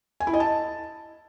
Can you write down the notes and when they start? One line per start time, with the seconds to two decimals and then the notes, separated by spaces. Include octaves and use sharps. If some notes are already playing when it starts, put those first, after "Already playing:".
0.20 G#5
0.27 E4
0.34 D#5
0.40 A5